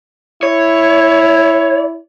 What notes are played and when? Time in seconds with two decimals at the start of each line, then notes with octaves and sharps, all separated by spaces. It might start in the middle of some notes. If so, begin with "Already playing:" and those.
0.43 E4 C#5